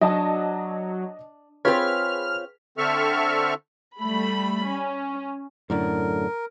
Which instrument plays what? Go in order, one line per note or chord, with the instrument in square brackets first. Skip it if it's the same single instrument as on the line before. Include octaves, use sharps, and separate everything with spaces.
[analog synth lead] F#3 [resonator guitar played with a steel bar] D4 [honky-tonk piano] D#5 A5 D#6
[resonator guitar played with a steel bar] C4 F4 C#5 [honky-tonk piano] G#4 B4 B6 [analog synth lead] F6
[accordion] D3 C4 A4 E5 C#6 F6
[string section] G3 A3 B5
C#4
[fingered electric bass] F#2 A2 D3 [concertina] A#4